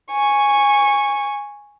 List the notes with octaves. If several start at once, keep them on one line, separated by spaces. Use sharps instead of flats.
G#5 C#6